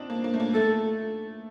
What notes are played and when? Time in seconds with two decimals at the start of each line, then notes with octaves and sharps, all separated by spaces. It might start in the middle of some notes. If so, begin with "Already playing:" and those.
Already playing: C4 D4 D#4
0.10 A#3
0.24 A#3
0.34 A3
0.40 A#3
0.54 A3 A4